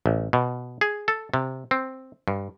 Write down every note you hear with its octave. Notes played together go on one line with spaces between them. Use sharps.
A1
B2
G#4
A4
C3
C4
G2